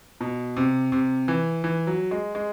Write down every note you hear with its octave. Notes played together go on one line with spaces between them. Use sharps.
B2
C3
C3
E3
E3
F#3
G#3
G#3